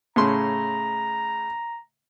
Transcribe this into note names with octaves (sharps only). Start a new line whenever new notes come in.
A2 C#3 A#5 C6